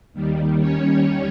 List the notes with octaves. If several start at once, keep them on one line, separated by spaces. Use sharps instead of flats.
D#2 D#3 G3
C#4 C#5